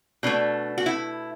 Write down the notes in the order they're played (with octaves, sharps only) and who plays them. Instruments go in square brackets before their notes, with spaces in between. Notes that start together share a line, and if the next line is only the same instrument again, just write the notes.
[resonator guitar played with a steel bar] B2 A3 D4
F#4
E4